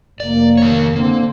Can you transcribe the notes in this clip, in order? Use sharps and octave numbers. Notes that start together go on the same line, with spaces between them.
F1 A#3 D5
D#3 C#5
D3 A#3 C4